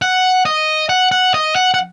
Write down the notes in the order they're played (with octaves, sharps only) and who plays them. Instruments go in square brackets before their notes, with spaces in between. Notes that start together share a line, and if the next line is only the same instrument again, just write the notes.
[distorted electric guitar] F#5
D#5
F#5
F#5
D#5
F#5
F#5